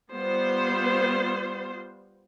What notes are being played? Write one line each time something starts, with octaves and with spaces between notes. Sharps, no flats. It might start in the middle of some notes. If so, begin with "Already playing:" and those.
G3 B3 F4 C5